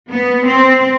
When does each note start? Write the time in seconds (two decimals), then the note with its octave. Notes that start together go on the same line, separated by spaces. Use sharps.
0.11 B3
0.46 C4